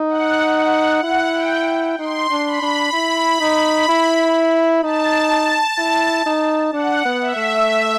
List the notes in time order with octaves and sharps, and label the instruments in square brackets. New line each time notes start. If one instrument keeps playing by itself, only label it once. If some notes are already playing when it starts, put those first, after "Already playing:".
Already playing: [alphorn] D#4
[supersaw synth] F#5
F#5
[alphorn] E4 [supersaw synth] F#5
[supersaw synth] G5
[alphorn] D#4 [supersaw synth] C6
[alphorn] D4
[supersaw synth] B5
[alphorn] D4
E4
D#4
E4
[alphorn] D#4 [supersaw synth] A5
[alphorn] E4
D#4
[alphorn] D4 [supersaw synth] F#5
[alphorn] B3
[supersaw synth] E5
[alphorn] A3